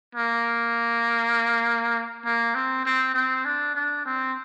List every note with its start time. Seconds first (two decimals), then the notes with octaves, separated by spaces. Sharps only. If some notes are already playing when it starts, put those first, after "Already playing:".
0.15 A#3
2.25 A#3
2.55 C4
2.86 C4
3.14 C4
3.45 D4
3.75 D4
4.06 C4